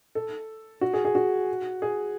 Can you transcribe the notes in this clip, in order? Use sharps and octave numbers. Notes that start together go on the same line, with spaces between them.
A4
F#4
G#4
G#4
F#4
G#4